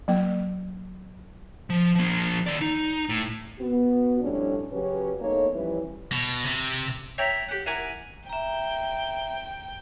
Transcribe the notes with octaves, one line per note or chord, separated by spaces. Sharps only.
F#3 A#3
F3
F3 A#3
D#3 D5
D#4
A2
B3 F#4
F2 A2 G3 C#4 D4
C#3 F#3 C#4 G4 B4
E2 A3 A#3 D#4 C#5
E3 F3 G3 C#4 E4 B4
B2
C3
C#5 E5 G5 A#5 B5
G4 F#5
E4 A#4 F#5 G#5 D6
E5 G5 A#5